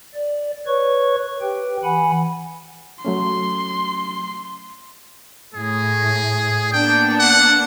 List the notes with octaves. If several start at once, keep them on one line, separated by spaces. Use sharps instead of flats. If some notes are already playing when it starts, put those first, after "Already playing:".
D5
B4 C#5 C#6
G4 B4 G5
E3 F#5 G#5 B5
F#3 A3 C#4 C6
A2 G#4
A#3 B3 D4 G5
F#5